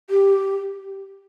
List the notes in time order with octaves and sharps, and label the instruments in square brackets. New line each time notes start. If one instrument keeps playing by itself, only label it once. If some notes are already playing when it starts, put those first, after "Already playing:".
[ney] G4